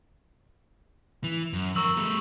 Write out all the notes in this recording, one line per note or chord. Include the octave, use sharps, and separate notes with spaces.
E3
F#2
F2 A#4 C#6 E6 F#7
G3 A3